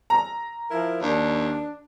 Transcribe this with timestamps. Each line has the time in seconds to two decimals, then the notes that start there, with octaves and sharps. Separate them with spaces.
0.10 A#5
0.70 F3 E4 A#4
1.02 D#2 D4